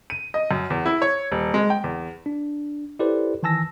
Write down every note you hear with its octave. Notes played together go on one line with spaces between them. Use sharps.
D#7
D#5
F#2
E2
E4
C#5
D#1
G#3
G5
E2
D4
E4 G4 A4 B4 C5 D5
D#3 E3 G#5 A5 E6 A#6